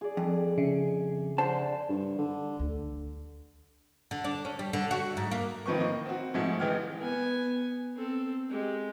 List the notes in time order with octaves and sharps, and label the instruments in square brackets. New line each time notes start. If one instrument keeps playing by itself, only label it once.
[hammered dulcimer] G#4 D5
[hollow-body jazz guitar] F2
[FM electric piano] C#3 [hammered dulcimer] E5
[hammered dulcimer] D3 [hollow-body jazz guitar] C5 A5
[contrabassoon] G2
D3
[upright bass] D2
[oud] D3
D4
C#4
G3
D3
F#4
G#2
A#3
[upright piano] A1 D#3 F3 B4 C5 C#6
A#3 D#5
C4 F#4
G#2 F3 G#3 A3
A1 E3 G#3 G4 F6
[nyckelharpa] B3 G#5
C4 A4
G#3 G4